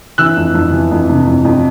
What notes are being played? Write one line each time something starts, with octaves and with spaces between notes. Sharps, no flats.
E3 E6 F#6
F2
F2
E3
F2
C3
F2
F2